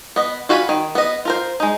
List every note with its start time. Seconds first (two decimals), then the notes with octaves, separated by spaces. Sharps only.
0.16 B3 D#5
0.49 F4 F#4 F5 G#5 B5
0.69 D#3
0.95 B3 D#5
1.25 F4 A#4 C5
1.60 G#3 D#4